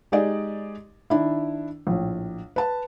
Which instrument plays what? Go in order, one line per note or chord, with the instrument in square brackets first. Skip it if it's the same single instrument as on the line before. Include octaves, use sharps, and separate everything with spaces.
[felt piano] G#3 D#4 G4 G#4 D5 D#5
D#3 D4 E4
A#1 A2
B4 A5